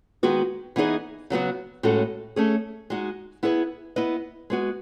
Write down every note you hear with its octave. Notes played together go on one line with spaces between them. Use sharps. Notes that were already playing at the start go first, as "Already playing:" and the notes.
D#3 G#3 B3 F#4
E3 B3 D#4 G#4 D#5
C#3 F#3 B3 F#4
A2 G#3 C#4 F#4 A4
A3 C#4 G#4
G#3 D#4 F#4
B3 E4 G#4 B4
B3 E4 B4 D#5
G#3 B3 F#4